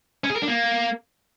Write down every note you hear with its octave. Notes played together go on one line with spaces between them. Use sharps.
C#4
G#4
A#4
D4
A#3